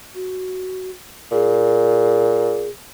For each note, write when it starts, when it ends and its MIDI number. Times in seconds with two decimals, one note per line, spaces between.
0.14 0.90 66
1.31 2.68 46
1.31 2.68 68